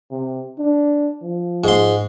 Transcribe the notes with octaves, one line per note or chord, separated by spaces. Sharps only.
C3
D4
F3
G#2 C6